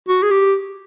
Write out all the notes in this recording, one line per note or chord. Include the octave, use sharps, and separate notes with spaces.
F#4
G#4
G4